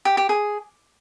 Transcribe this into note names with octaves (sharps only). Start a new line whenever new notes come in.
G4
G4
G#4